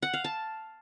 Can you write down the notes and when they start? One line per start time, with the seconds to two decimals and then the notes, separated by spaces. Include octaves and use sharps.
0.02 F#5
0.13 F5
0.24 A5